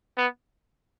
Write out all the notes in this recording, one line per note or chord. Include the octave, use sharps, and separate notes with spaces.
B3